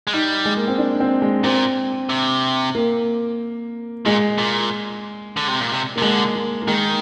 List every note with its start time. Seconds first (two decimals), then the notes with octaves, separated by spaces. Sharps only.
0.07 G#3
0.13 G3 D#4
0.45 G#3
0.57 A#3
0.68 C4
0.78 D4
1.00 C4
1.22 G#3
1.44 A#2 C4
2.10 C3
2.75 A#3
4.06 A#2 G#3
4.38 A#2
5.37 D3
5.48 C3
5.60 A#2
5.71 C3
5.96 C3 A#3
6.02 D3 G#3
6.35 A#3
6.62 A#3
6.67 D#3 G#3